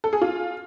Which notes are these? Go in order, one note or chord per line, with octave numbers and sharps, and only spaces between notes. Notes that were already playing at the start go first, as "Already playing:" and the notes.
A4
G#4
F4